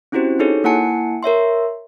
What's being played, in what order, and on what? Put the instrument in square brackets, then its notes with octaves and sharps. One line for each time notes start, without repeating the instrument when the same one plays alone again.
[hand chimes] C4 C#4 E4 F#4 G4 C5
D#4 F#4 G#4 A4 C#5
A#3 E4 F#5 G#5 A5 C#7
A#4 C#5 E5 C6